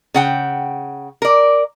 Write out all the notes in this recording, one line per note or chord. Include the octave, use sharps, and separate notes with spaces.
C#3 F#5 G5
A#4 D5